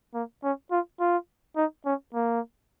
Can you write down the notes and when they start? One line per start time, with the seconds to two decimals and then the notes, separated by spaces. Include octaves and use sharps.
0.14 A#3
0.43 C#4
0.71 F4
1.00 F4
1.56 D#4
1.85 C#4
2.14 A#3